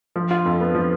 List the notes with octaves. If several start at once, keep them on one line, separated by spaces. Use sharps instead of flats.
F3
F4
F2
B3
F3